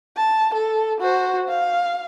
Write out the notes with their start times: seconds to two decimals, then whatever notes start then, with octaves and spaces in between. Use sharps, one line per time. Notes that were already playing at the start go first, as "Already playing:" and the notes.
0.17 A5
0.54 A4
1.00 F#4 C5
1.48 F5